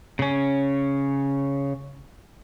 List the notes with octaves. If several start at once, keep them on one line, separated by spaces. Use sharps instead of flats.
C#3 C#4